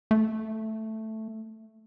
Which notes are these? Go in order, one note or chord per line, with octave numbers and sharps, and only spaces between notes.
A3